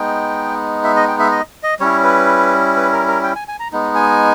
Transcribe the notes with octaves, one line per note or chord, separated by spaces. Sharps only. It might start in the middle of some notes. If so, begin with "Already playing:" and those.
Already playing: G#3 B3 D#4 G5
E5
D#5
G5
E5
D#5
D#5
G3 C#4 E4 C#5
B4
B4
A#4
A#4
G5
G#5
G#5
A#5
G#3 B3 D#4
G#5